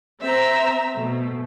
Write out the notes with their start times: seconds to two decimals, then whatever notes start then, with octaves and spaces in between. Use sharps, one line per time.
0.21 C4 E5 A#5
0.96 B2 A3